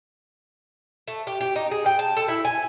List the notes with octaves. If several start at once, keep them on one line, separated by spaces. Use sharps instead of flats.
A3
G4
G4
D#4
G#4
G5
A5
A4
E4
G#5